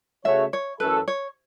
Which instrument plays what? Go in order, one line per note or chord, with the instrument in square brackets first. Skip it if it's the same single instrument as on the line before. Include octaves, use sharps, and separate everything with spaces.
[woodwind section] C#3 A3 F#4 C#5 [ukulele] E5
[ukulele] C#5
[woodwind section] F#2 E3 A3 C#4 A4 [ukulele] B4
[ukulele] C#5